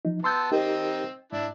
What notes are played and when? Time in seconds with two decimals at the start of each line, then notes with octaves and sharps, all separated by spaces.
0.05 F3 D#4
0.24 B3 A5 C6 E6 G6
0.51 C4 D#4 G4 A#4 D#5 G5
1.32 G#2 D4 E4